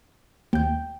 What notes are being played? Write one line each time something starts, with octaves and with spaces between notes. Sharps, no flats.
D#2 G5 G6